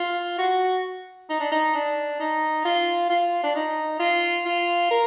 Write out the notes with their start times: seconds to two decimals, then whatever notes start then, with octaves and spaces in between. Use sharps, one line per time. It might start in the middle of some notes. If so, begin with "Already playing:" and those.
Already playing: F4
0.38 F#4
1.30 D#4
1.40 D4
1.52 D#4
1.75 D4
2.20 D#4
2.65 F4
3.10 F4
3.43 D4
3.55 D#4
3.99 F4
4.45 F4
4.91 A#4